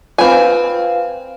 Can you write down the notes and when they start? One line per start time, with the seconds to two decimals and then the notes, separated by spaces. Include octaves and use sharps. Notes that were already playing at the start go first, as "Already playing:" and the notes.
0.18 C4 F4 B4 F5 G#5